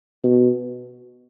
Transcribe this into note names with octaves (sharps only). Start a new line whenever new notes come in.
B2